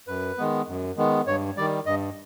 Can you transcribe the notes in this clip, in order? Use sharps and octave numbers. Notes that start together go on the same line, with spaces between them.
F#2 B4
D#3 G#3 B3
F#2
D#3 G#3 B3
G2 C#5
D#3 G3 D5
G2 D#5